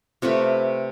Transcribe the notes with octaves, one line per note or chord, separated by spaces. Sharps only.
C3 A3 F4 B4